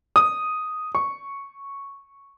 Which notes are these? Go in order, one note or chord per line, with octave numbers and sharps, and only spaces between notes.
D#6
C#6